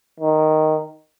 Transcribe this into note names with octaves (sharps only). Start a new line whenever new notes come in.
D#3